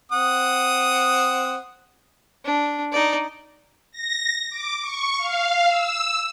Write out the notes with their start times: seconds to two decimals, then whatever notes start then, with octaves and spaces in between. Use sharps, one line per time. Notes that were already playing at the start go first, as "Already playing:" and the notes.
0.12 C4 F#5 D#6
2.45 D4
2.92 D#4 D5
3.91 A#6
4.50 D6
4.81 C#6
5.17 F5
5.67 E6